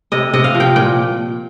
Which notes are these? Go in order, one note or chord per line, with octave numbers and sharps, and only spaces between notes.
C3 D#5
C3 D#5
F5
F3
G5
A#2 G5